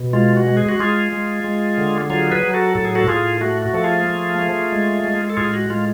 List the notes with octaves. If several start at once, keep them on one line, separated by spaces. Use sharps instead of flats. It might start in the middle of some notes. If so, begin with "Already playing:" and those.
Already playing: B2
G#3 F4
F#4
G#3
G#4
F#4
G#3 F4 G#4
G#3
G#3
D3
F#3 F4 G#4
G#4 B4
F#3
F#4 A4
A2 A4
G#4
F#4 A4
A2 F4 G#4
A3 F#4
F#4
F3 A4
F4 G#4
A3
A3
G#3
G#3
A4
A2 F4 G#4
F#4
G#3 F4